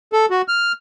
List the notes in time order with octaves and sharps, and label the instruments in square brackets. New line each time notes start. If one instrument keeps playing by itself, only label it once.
[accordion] A4
F#4
F6